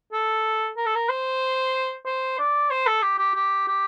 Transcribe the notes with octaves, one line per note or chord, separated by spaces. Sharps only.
A4
A#4
A4
A#4
C5
C5
D5
C5
A4
G4
G4
G4
G4